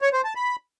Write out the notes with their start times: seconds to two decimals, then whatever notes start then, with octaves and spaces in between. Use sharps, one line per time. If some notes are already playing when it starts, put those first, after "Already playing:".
0.02 C#5
0.13 C5
0.24 A5
0.36 B5